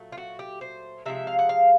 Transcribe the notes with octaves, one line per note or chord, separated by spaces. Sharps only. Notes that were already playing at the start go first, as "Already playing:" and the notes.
Already playing: A#2 F#3 A3
F4
F#4
G4
C5
C3 F3 G#3 E5
F5
F#5
F5